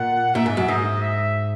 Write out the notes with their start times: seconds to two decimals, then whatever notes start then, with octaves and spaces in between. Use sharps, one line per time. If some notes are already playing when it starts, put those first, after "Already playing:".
Already playing: A#2 F#5
0.35 A#2 E5
0.46 G#2
0.57 F#2
0.68 G#2 D#5
1.02 E5